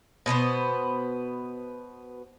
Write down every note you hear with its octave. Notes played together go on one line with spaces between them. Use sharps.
B2 B3 D#4 C5